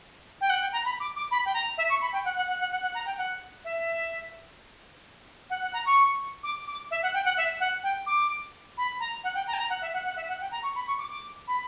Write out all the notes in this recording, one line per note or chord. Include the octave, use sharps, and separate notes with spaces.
G5
F#5
G5
A#5
B5
D6
D6
B5
G5
A#5
E5
C#6
B5
G5
F#5
F#5
F#5
F#5
F#5
F#5
A#5
G5
F#5
E5
F#5
F#5
A#5
C#6
D6
D6
E5
F#5
G5
F#5
E5
F#5
G5
D6
B5
A#5
F#5
G5
A#5
G5
A#5
F#5
E5
F#5
F#5
E5
F#5
G5
A#5
C#6
B5
C#6
D6
D6
B5